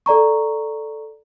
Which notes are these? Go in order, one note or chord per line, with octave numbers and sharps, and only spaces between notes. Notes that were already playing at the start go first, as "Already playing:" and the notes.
A4 D5 A#5 C#6